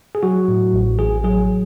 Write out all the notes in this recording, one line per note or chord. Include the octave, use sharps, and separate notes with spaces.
G#4
F#3 F#4
A2
A1
A1 G#4
F#3 G#4